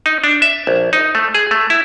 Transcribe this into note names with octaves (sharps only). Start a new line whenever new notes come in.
D#4
D4
E5
A#1
D#4
A3
G#4
A3
E4